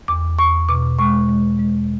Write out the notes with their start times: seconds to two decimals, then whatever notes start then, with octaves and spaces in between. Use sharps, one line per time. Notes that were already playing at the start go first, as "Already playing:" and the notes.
0.08 E2 D6
0.39 E2 C#6
0.69 B2 D6
0.99 G#3 C#6
1.29 G#3
1.59 G#3